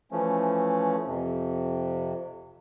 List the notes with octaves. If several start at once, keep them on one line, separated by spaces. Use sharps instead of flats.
E3 F3 A3 C#4
F2 C3